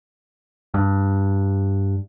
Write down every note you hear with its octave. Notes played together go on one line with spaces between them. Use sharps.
G2